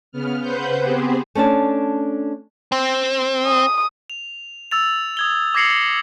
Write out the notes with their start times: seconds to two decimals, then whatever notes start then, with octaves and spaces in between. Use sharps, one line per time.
0.12 C#3 B3 F6
0.40 C#3 B4 C5 F#5 G6
0.80 B3 C4 G4 G#4 C5
1.35 A3 C#4 D4 A5
2.72 C4
3.47 D#6
4.10 F7
4.71 E6 A6 F7
5.17 D#6 G#6 G7
5.55 D6 G#6 A#6 C7 C#7 F#7